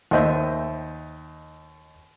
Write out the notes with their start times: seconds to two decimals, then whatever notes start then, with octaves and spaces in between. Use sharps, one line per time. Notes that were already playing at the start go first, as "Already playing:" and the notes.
0.11 D#2 C5 D#5 E5